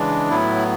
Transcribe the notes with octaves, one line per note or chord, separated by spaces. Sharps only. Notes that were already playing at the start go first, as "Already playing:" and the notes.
Already playing: C#3 E3 G#3 D4
A2 F#3 B3 E4